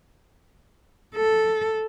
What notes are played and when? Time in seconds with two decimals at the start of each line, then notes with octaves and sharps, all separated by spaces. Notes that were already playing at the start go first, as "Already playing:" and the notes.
1.15 A4